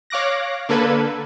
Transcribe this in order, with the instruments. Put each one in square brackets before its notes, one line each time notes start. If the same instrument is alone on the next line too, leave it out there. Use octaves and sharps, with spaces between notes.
[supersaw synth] C#5 F5 D6 F#6 A#6
D3 A#3 A4 B4 G#6